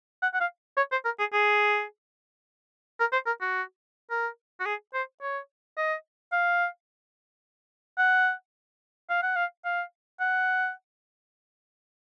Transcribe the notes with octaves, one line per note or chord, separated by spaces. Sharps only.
F#5
F#5
F5
C#5
C5
A#4
G#4
G#4
A#4
C5
A#4
F#4
A#4
F#4
G#4
C5
C#5
D#5
F5
F#5
F5
F#5
F5
F5
F#5